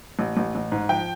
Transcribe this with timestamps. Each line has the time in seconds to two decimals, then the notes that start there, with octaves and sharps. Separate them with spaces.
0.19 A1
0.37 A1
0.55 A1
0.72 G#2
0.89 F3 G5